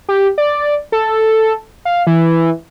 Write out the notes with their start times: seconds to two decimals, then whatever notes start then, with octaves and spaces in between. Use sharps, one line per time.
0.09 G4
0.38 D5
0.92 A4
1.85 F5
2.07 E3